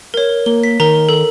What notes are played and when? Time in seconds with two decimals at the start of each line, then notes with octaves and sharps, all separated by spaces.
0.14 A#4 C#5
0.46 A#3 G7
0.63 B6
0.80 D#3 A#4 A#5
1.09 A4